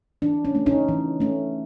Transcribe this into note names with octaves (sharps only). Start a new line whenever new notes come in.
E3 D4
C#4
A3 C#4
C#4 D#4
E3
A3 C#4